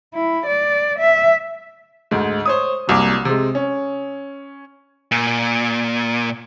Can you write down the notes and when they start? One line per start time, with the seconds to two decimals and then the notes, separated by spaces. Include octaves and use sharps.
0.14 E4
0.46 D5
0.99 E5
2.11 D2 G#2
2.46 C5 C#5 D#6
2.87 D1 C2 A#3 D6
3.25 C3 G#3
3.55 C#4
5.11 A#2